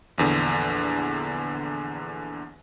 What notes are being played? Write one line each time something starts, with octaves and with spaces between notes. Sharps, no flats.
A#1 E2 D3